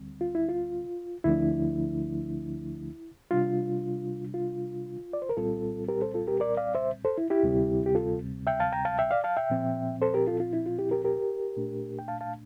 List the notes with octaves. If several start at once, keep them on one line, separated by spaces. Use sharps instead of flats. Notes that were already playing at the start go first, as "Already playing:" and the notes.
Already playing: D2 D3 G3 C4
F4
E4
F4
D2 D3 F3 A3 D4 E4
C3 G3 D4 F4
F4
D5
C5
A#4
C2 A#2 G3 C4 F4 A4
G4 A#4
A4 C5
F4 A4
G4 A#4
A#4 D5
D5 F5
C5 E5
A4 C5
E4
E4 G4
D2 C3 G3 C4
G4
F4 A4
E5 G5
F5 A5
G5 A#5
F5 A5
E5 G5
D5 F5
F5 A5
E5 G5
A#2 F3 C4
A4 C5
G4 A#4
F4 A4
F4
E4
F4
E4 G4
G4 A#4
G4 A#4
A#2 A3 D4
G5
F5 A5
F5 A5